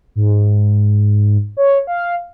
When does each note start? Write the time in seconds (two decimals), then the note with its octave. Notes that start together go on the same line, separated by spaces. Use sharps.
0.15 G#2
1.57 C#5
1.87 F5